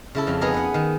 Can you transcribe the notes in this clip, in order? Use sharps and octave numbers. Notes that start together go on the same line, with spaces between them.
C#3 E4 A4
F2 F3
B3 D#4 G#4 A#4
B4 F#5
D#3